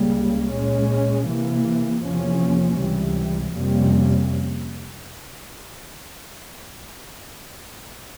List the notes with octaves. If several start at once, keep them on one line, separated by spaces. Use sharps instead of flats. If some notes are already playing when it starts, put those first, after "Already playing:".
Already playing: C#2 C#3 G3 A#3
A#2 G#3 C#4
C3 E3 A#3
E2 C3 F3 A#3 C#4
C#2 C3 E3 G3
F2 C3 G3 A#3 C#4